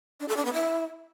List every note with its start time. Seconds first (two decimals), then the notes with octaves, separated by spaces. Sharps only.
0.20 D4
0.28 A4
0.37 D4
0.45 B3
0.53 E4